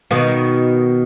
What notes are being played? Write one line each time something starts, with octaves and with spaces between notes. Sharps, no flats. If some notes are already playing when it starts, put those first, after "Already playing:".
B2 D#3